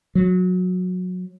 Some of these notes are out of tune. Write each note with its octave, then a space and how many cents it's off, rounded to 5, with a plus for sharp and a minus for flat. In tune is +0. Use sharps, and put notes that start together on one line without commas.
F#3 -20